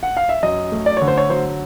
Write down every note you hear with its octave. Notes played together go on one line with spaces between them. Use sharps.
F#5
F5
E5
F#2 D#5
A3
D5
D3 C#5
C5
C#5
F#3 C5